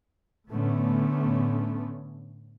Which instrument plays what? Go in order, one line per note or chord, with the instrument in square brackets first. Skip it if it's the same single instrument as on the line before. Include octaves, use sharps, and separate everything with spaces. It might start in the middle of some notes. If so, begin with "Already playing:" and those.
[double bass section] A2 D3 A3 B3 C#4